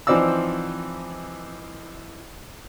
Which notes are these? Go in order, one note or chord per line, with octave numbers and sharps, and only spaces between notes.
E3 F3 C4 D#4 D5 E6